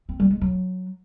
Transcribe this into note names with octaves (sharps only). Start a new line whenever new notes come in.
C4
G3
G#3
F#3